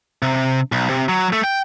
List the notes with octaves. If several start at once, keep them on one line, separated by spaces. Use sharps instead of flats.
C3
B1
C3
F#3
A3
G5